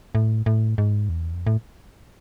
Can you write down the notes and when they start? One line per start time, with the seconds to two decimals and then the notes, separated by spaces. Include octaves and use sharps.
0.15 A2
0.46 A2
0.78 G#2
1.09 E2
1.33 F2
1.47 A2